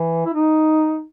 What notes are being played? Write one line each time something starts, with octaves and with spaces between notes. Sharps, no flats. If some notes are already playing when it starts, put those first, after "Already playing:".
Already playing: E3
E4
D#4